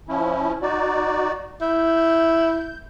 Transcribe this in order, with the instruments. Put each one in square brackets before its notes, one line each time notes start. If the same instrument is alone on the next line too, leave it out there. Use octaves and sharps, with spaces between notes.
[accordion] F3 C#4 E4
D#4 F#4 D5
[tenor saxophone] E4 [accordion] G6